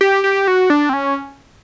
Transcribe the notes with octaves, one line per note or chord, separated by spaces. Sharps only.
G4
G4
F#4
D4
C4
C#4